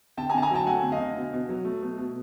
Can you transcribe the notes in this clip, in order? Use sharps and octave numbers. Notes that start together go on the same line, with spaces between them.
D3 G5 A5
G#5 A#5
D3 A5
G#5 A#5
F#3 G5 A5
A3 F#5 G#5
D3
D#5 F5
D3
B2
B2
F#3
A3
B2
B2